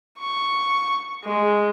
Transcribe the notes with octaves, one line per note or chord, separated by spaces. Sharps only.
C#6
G#3